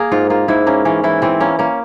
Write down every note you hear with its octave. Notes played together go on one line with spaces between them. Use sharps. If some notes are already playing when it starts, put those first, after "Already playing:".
Already playing: A#3 G#4 A#4
G#2 F4
A#3 F4
G#2 E4
A#3 C#4
E3 C#4
E3 E4
E3 C4
A#3 C#4
A#3 C#4